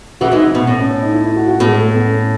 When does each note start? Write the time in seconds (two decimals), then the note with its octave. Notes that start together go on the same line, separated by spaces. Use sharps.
0.21 C#3 E3 F#4
0.32 E3 G#3 D#4
0.43 D#4
0.55 B2 B3
0.66 A2 B3
0.79 C#4
0.91 C#4
1.02 D#4
1.13 E4
1.25 E4
1.36 F#4
1.48 F#4
1.60 A2 B3
1.65 G#3
1.72 A3
1.82 A3
1.94 B3
2.07 C#4